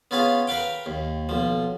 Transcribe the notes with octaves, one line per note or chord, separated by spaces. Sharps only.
B3 C#4 F4 G#4 F5
A#4 B4 F5 G5
D#2
B1 F3